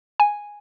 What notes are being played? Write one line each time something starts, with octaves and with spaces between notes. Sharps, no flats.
G#5